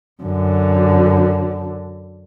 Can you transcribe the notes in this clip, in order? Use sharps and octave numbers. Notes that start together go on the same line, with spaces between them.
F#2 D3